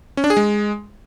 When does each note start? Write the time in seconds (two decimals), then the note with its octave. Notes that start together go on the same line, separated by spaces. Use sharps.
0.17 C#4
0.24 D4
0.30 G#4
0.37 G#3